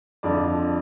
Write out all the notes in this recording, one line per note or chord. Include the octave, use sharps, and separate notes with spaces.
F2 D3 F3 D5